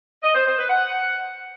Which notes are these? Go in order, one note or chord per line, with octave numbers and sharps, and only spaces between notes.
D#5
C5
C5
B4
F#5